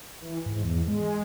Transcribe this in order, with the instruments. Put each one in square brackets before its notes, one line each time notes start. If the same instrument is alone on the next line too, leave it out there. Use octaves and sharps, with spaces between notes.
[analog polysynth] E3
G#2
E2
G#3